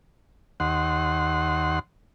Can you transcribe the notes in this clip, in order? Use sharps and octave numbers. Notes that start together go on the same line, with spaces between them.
D#2 F#5 C6